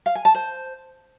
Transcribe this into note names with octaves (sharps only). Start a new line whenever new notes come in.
F5
G#5
A5
C5